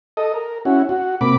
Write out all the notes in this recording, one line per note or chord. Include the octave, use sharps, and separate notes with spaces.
A4 D#5
A#4
C#4 E4 F#4
F#4
C3 A#3 B5 D6